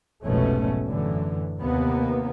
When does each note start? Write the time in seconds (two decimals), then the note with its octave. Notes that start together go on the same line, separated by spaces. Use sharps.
0.25 F1 B1 G#2 B2 A3 C#4
0.87 F#2 A2 D3 E3
1.59 D#2 C3 A#3 B3